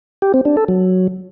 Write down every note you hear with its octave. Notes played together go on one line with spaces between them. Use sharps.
G4
C4
D4
A4
F#3